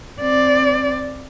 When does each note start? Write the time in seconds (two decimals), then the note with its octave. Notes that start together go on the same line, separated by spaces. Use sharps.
0.21 C4 D5